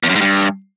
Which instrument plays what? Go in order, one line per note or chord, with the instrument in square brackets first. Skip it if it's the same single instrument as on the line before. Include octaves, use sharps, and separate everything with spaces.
[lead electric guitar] E2
F#2
G#2
G2